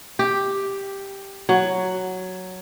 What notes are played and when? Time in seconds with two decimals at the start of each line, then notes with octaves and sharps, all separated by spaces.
0.19 G4
1.49 F#3